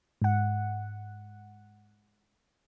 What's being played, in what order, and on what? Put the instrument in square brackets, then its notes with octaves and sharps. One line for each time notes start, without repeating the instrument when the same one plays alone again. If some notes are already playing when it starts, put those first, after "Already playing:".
[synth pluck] G#2 F#5